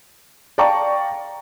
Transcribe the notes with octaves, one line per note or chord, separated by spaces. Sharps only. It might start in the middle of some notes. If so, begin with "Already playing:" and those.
D5 F5 G5 A5 A#5 C#6